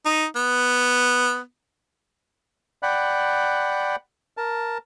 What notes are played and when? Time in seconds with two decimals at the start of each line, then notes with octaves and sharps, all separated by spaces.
0.06 D#4
0.36 B3
2.83 D5 F#5 G5 B5 F#6
4.37 A#4 A5